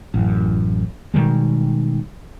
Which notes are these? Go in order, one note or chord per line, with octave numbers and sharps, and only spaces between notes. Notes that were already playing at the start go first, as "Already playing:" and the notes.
A1 F#2
B2 D#3 G3 G#3